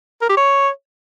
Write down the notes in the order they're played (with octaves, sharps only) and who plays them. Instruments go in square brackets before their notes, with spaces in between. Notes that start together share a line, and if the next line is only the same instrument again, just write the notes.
[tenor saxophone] A#4
G4
C#5